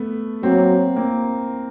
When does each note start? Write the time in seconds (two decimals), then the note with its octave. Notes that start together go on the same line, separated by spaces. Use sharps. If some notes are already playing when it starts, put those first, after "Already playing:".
Already playing: A3 B3
0.43 F#3 A#3 C4
0.96 A#3 C4